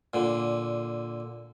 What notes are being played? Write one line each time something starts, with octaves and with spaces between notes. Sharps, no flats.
A#2 D3